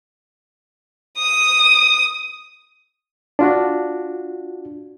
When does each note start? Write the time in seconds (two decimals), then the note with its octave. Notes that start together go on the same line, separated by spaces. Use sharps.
1.18 D#6
3.39 D4 F4 F#4